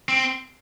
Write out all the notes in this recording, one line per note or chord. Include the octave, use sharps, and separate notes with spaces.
C4